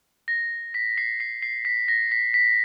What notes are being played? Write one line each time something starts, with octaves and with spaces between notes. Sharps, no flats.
A#6
B6
C7
C7
C7
B6
A#6
B6
B6